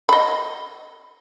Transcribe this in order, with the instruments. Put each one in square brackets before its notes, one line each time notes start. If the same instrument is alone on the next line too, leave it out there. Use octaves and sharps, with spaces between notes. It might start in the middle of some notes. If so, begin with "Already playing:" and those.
[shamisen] D#5 B5